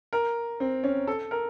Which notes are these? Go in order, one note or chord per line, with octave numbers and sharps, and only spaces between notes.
A#4
C4
C#4
A4
A#4